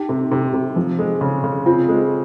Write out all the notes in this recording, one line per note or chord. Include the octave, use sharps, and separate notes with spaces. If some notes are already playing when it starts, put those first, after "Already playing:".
Already playing: D#4 G4
C3
C3
C3
F3
G#3
C#3
C#3
C4 F4
G#3